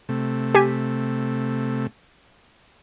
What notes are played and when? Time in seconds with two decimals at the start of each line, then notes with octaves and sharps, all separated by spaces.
0.09 C3 A3
0.55 G4 G#5 B6